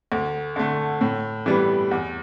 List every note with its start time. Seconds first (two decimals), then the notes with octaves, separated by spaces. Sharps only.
0.12 D2
0.56 D3 A3
1.01 A2
1.46 E3 G3 B3
1.91 E2